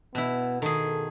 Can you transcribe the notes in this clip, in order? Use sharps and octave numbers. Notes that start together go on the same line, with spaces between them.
B2 B3 E4
D#3 G#4 A4